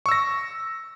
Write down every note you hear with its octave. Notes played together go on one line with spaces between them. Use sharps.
C#6 E6 A#6